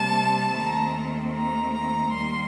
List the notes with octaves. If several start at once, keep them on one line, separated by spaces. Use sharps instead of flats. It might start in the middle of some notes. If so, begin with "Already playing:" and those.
Already playing: C3 G3 A#3 A5
D#2 D#3 A3 C4 A#5
A#5
A#5
D#2 D#3 G3 A#3 C6